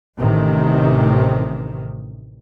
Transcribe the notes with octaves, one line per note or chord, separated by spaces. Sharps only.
A1 C3 D#3